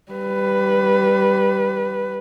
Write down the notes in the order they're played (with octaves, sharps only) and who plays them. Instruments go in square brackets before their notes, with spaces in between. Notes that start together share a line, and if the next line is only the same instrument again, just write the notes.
[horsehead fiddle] G3 B4